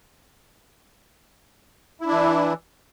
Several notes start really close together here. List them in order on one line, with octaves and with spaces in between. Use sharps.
E4 D4 E3